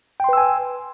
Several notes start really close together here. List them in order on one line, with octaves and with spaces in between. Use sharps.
G5 C6 B4 E6 G#5